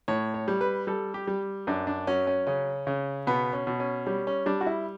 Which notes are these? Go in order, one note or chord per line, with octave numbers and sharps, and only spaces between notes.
A2 C#5
C#5
G3
B4
G3 A4
G4
G3
F#2 D4
D4
F#3 C#4
C#4
C#3 C#4
C#3
B2 B3
C#4
B2
C#4
G3 C#4
C#4
G3 D4
F#4
E4